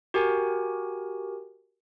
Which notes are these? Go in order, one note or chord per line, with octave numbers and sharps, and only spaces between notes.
F#4 G4 A#4 G#5